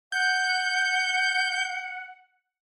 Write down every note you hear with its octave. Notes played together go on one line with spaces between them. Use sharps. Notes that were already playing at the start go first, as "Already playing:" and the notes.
F#5 G6